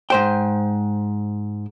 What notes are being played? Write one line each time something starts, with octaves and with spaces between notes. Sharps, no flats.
G#2 C5 G5